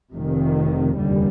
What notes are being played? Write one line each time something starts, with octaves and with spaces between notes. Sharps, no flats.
F1 F2 C3 D#3
F1 D#2 D3 G3